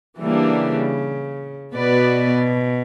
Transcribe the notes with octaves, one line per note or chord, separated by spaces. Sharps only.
C#3 E3 G3 A#3 D4
B2 B3 F#4 B4 D5